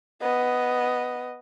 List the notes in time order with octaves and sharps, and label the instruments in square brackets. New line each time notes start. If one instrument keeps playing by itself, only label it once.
[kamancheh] B3 D#5